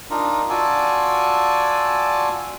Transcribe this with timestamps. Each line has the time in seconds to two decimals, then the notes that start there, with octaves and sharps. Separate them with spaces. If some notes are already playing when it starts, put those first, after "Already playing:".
0.10 D4 D#4 F4 A#4
0.50 F4 F#4 D5 G#5 A5 E6